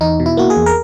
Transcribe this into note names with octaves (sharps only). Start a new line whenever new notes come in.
E2 D#4
B2
E4
A#3 F#4
G#4
E2
A#4